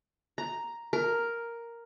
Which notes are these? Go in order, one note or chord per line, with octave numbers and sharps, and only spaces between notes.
A#5
A#4